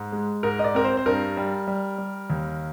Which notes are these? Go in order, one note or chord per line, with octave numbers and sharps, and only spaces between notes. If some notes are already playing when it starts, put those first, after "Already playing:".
Already playing: G#2
G#3
G#2 A#4
D#5
D5
C4 A#4
C5
C5
G2 A#4
G3
G3
G3
D#2